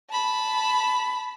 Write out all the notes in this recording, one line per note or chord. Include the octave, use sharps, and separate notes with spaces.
A5 B5